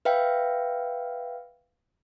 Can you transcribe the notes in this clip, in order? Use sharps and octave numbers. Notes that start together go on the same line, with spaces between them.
B4 E5 F5 G5